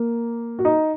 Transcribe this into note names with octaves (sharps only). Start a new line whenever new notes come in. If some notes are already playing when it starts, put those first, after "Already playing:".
Already playing: A#3
F#4
D#4